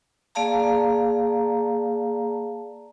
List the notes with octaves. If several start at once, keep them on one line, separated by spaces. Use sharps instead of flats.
A#3 G#4 D5 F5 A5 A#5